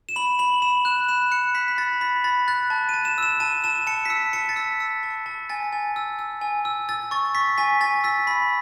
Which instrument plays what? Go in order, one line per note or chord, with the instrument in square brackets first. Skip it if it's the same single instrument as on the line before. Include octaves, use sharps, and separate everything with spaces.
[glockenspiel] E7
B5 F#7
B5 F#7
B5 E7
F#6 E7
B5 E7
F#6 C#7
B5 B6
B6
B5 A6
B5 B6
B5 A6
F#6 A6
A5
A5 D#7
E7
E6 E7
A5 D#7
A5 E7
A5 C#7
B6
E6 C#7
A5 C#7
A6
E6 B6
E6
A5
A5
G#5 A6
G#5
E6
E6
G#5
E6
E6 A6
C#6 A6
C#6 B6
G#5 B6
G#5 A6
E6 B6
B5 B6